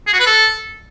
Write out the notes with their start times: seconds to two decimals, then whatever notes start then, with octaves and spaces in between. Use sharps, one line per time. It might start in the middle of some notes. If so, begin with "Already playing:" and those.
0.07 G#4
0.13 F#4
0.20 B4
0.26 A4